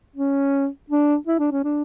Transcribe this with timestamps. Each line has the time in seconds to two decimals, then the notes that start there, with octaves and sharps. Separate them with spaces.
0.16 C#4
0.90 D4
1.27 E4
1.39 D4
1.52 C#4
1.64 D4